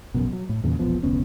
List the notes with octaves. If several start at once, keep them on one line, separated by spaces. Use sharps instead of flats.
A#1 F#2 B2
F#3
A2
E2 A#2 C#3
E1 A#1 F3 B3
F1 D2 B3 C#4